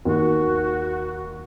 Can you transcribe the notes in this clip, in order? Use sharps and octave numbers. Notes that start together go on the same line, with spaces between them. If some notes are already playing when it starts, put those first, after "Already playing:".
D#2 F#4